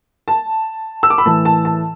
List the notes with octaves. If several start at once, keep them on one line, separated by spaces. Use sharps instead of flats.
A5
E6
D6
B5
A2 E3 A5
A5
A5